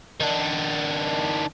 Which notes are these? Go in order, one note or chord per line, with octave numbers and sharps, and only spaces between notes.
D#3 D4